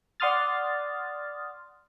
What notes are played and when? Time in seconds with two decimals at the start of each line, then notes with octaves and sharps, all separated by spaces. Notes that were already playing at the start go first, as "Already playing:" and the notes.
0.20 D5 F#5 C6 D#6 F6 A6